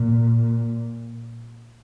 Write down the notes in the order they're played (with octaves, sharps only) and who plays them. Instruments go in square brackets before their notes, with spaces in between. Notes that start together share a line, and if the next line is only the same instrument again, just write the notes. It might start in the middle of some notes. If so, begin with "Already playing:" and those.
Already playing: [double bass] A#2